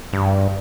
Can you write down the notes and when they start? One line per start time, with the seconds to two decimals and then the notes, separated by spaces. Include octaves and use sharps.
0.13 G2